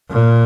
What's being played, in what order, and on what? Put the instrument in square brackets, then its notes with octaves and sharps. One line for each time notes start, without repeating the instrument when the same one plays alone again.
[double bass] A#2